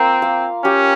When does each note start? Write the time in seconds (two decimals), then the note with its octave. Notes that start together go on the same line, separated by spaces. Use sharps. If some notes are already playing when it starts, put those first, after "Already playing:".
Already playing: A#3 C4 F4 A#4
0.22 F5
0.65 C#4 G4